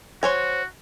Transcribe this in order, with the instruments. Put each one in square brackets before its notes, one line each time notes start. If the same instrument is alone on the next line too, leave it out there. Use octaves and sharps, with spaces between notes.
[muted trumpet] F#4 [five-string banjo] C5 C#5 G#5